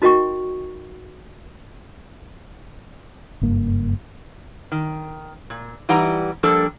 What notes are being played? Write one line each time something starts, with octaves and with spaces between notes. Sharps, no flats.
D#4 F#4 A#4 D#5 G5 C#6
F#1 G2 A#3
D#3
A#2
E3 G3 D#4 G4 F#5 A#5
F3 G3 A#3 D4 A4